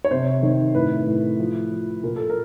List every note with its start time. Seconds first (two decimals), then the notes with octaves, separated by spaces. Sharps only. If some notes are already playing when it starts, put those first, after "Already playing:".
0.04 C#5
0.11 C3 C5
0.43 D#3
0.75 A2 B4
1.07 A2
1.39 F3
1.72 F3
2.03 A#2 A#4
2.16 A4
2.30 A#4